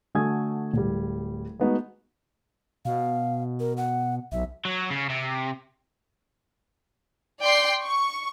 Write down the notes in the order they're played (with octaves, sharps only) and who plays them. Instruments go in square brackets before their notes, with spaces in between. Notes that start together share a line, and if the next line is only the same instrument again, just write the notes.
[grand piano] D3 A3 F#4 G#5 D#6 G#6
D1 G3
G#3 A3 B3 D#4 F#4
[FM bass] B2 [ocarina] F5
[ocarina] A#4
F#5
[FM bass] B1 [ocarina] E5
[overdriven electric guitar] F#3
C#3
C3
[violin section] D5 G5 C6 C7
C#6